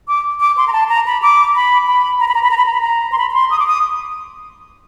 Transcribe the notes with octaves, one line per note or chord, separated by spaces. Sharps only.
D6
D6
C6
A#5
A5
A#5
B5
D6
B5
B5
A#5
B5
A#5
B5
A#5
B5
A#5
B5
A#5
C6
B5
B5
C6
D#6
D6
D#6